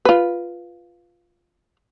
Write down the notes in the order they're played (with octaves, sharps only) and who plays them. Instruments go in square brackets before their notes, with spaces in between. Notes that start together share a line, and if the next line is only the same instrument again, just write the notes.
[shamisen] F4 B4